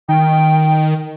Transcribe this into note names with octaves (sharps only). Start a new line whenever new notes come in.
D#3 G5